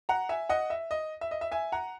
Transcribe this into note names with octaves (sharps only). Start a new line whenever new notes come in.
F#5 A#5
E5 G#5
D#5 F#5
E5
D#5
E5
D#5
E5
E5 G#5
F#5 A#5